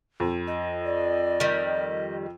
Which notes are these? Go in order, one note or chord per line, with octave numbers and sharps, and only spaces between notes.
F2
D#5
D5
D#3 G3